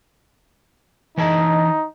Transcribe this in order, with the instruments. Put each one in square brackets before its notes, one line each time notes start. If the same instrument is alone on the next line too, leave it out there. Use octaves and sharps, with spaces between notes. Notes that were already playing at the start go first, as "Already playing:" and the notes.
[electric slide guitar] E3 D#5 A5 [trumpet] D#4